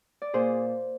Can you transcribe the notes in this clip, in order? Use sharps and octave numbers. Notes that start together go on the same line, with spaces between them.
D5
A#2 G#4 C5